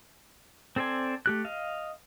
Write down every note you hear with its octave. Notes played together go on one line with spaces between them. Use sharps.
C4 A4 C5 D5 G#5
A3 G4 F#6
D#5 F5